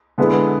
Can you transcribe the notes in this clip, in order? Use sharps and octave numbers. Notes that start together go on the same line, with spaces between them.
D3 G#3 B3 E4 B4